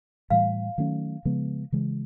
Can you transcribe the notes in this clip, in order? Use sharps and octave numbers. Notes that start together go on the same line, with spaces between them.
A2 E3 G3 F5
D#3 F#3 A3 C#4
C#3 F3 G#3 B3
C#3 E3 G#3